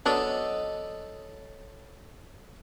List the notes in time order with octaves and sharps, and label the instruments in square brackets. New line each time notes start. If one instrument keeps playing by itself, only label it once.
[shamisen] F#3 B3 D4 [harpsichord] A4 C#5 B5 [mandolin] D#5